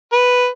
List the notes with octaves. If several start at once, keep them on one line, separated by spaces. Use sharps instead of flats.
B4